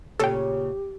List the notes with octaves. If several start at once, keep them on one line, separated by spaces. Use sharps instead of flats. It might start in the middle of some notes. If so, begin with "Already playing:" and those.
A#2 C#3 G4 A4 C#5 G5